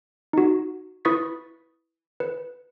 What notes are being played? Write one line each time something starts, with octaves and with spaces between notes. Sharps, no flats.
D#4 F#4
E4 B4 C#6 D#6 A6 B6
B4